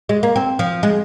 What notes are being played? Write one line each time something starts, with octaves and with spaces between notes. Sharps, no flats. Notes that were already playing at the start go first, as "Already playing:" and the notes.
G#3
A#3
C4
F3
G#3